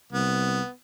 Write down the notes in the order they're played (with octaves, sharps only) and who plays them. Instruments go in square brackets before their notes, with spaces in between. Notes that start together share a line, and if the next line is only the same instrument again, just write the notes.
[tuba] C2 [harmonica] B3